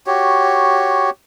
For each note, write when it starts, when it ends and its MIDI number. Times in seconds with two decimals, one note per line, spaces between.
0.07 1.10 66
0.07 1.10 67
0.07 1.10 73